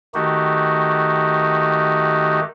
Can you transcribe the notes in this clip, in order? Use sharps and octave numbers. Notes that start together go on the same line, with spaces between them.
D#3 A3 D#4 F#4 G4